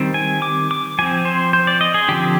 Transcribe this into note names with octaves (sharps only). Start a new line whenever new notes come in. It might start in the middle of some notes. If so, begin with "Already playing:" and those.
Already playing: D#3 G3 C4
G#5
D6
D6
F3 C4 G#5
C5
C5
D5
D#5
G#4
D3 F3 C4 G4